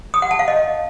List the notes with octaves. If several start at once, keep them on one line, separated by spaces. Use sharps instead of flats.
D#6
F#5
A5
F5
D#5